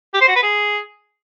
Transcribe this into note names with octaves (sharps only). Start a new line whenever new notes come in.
G4
C5
F#4
B4
G#4